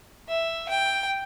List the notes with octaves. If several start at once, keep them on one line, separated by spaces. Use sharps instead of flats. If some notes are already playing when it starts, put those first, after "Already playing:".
E5
G5